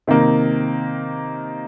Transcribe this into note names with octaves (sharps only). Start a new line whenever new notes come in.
C3 D#3 A#3